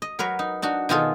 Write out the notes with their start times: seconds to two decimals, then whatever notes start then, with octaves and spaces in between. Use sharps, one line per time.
0.02 D#5
0.19 F#3 A#4 B4 C#5
0.39 D#4
0.62 D4 D#4 F#4
0.89 B2 D#3 D#4 F4 G#4 A4